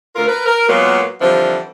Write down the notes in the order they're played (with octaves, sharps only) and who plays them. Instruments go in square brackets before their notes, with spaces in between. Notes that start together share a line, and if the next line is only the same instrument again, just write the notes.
[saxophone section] D2 F4 A#4
A#4 B4
A#4
A#2 F#3 G#3 A#3 B3
D3 E3 F3 G3 C4